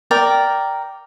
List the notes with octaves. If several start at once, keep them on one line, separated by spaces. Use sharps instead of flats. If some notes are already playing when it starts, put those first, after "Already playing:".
A#4 D5 G5